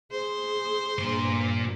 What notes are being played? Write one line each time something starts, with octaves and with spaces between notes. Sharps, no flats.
G#4 C5
G2 A#2 C6